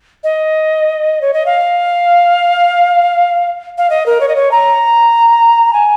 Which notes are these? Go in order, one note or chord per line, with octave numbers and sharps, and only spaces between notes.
D#5
C#5
D#5
F5
F5
D#5
A#4
C#5
D#5
C#5
A#5
G#5